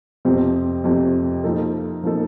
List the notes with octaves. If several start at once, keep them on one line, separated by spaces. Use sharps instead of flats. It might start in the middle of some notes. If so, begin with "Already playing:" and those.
F2 C3 F3 C4 G4
F2 C3 F3 C4 G4
F3 A#3 D#4 A4
F3 A#3 D#4 A4